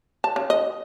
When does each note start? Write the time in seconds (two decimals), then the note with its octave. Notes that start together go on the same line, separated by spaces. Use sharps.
0.24 A5
0.36 C#3
0.50 D#5